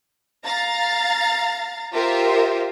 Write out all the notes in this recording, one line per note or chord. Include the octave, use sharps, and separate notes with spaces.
F5 A#5 A6
F4 G4 A#4 C5 E5